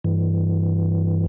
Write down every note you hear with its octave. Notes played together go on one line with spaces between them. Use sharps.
G2 E3